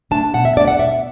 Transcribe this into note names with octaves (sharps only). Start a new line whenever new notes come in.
A3 D4 A5
B2 F#5
E5
A3 D4 D5
F#5
B2 E5